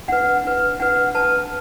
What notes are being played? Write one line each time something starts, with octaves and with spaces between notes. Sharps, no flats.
D4 B4 F#5
D4 B4
D4 B4 F#5
D4 B4 A5